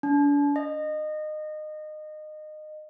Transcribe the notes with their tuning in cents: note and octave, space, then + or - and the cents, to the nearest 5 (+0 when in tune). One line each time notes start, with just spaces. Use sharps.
D4 -40
D#5 -25